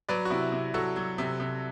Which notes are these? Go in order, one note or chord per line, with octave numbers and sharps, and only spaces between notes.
F#3 B4 D5
F#4
C3 E4
C3
F#3 F#4 A4
F#3
C3
C3